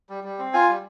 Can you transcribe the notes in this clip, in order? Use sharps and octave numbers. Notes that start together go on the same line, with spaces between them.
G3
G3
C4
F4 G#5
G3